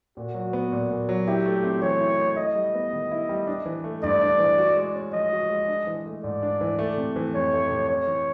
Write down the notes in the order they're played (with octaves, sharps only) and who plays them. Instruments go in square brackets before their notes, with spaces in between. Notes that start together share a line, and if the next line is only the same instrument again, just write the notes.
[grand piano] A#2 [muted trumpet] F#4
[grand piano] F#3
B3
A#2
A#2
F#3
[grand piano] E4 [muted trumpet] G4
[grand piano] A3
C4
[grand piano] E3 [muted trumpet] C#5
[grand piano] E4
A3
[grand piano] E4 [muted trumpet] D#5
[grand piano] G3
B3
D#3
E4
G3
D4
E3
A3
[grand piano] G2 [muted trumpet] D5
[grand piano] D4
E3
F#4
G#3
C#4
[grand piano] F3 [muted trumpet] D#5
[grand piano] F#4
G#3
D4
E3
A3
[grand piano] G#2 [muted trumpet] D5
[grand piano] D4
E3
A3
C3
E3
[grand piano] F2 [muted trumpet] C#5
[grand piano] A3
C3
[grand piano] C#4 [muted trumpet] C#5
[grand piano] E3